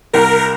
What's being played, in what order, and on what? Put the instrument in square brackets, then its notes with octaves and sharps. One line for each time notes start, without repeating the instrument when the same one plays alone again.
[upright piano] C2 [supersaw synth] A#4